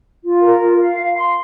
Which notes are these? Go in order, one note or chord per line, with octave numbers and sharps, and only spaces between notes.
F4
A#4
F4
F5
F5
C6